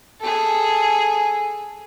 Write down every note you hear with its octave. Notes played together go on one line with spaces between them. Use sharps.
G#4 A4